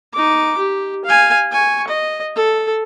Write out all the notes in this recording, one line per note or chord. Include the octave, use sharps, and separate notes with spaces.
D#4 D6
G4
F5 G#5
G#5 C#6
D#5
A4